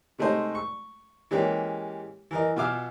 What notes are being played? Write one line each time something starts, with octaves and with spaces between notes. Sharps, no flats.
C3 G#3 A3 D#4 C5
C#6
E3 G3 G#3 A#3 C#4 G4
E3 A#4 D#5
B2 F4 E5 G#5 D6 F6